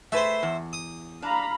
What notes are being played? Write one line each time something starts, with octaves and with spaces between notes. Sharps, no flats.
A3 G#4 B4 C5 E5
E2
D#6
D4 F5 A#5 B5